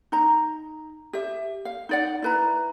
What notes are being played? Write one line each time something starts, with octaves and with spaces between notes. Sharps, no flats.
D#4 A#5
G4 E5
F5
D#4 D5 F#5
E4 B4 A#5